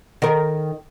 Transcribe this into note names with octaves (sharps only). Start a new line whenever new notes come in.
D#3 A#4